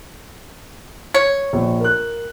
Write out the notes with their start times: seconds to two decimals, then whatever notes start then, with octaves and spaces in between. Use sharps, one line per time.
1.14 C#5
1.53 A#1
1.80 A#4 F#6